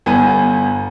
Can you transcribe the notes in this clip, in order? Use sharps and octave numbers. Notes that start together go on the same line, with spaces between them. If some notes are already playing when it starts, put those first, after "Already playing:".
G1 B3 G#5